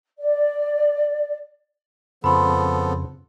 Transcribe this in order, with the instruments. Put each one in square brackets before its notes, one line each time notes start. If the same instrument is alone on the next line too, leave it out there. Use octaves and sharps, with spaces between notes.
[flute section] D5
[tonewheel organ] F2 C#3 [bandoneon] F3 B3 A4 [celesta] B5 C6